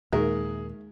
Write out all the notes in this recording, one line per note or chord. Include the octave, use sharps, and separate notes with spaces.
D#2 A#2 G#3 D#4 G#4 A#4 E5